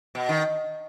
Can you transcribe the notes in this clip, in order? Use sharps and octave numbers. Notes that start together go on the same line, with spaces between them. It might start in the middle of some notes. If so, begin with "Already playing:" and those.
B2
D#3